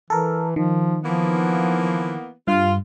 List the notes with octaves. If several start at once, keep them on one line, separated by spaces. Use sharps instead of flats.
E3 A4 A#4
D#3 F3
E3 F3 A#3 B3
G2 F4